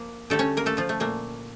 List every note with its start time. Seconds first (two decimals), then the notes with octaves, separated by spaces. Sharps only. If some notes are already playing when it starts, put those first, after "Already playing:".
Already playing: F3 A#3
0.30 D3 G3 A3 A4
0.39 C#4 C#5
0.57 A#3 A#4
0.66 A3 A4
0.77 F3 F4
0.89 A3
1.00 A#2 A3 A#3